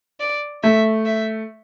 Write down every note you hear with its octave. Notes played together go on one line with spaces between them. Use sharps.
D5
A3 E5
E5